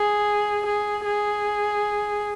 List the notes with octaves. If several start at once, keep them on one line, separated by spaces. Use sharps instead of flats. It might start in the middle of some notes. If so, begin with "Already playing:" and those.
Already playing: G#4
G#4
G#4